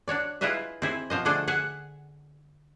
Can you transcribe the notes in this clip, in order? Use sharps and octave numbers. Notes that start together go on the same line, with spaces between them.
D4 F#4 C#5 D5
E4 F4 G#4 B4 D#5 E5
C4 E4 G#4
B2 F3 C5 D#5
D3 A3 D4 G#4 A4
G#4 E5 F#5